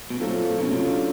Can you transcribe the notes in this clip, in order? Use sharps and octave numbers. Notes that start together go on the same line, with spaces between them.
B2
A#2 F#3 A3 C4 F4 A4
A#2
B2 F#3 A3 C#4 F4
C3
D3